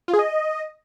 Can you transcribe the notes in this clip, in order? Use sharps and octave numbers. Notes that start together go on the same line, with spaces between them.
F4
G#4
D#5